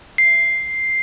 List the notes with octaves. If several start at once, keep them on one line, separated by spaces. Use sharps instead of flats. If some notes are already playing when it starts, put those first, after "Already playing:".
C7